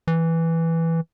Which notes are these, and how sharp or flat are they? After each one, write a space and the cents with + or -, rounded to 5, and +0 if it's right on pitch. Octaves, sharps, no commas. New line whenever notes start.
E3 +0